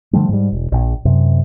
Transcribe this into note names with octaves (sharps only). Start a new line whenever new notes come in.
D3 F3 G3 A3
G#2 G3
E1
A#1
F#2 C3